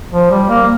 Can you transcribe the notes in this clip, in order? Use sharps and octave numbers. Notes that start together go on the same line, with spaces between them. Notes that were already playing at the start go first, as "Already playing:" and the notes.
F3
G3
A#3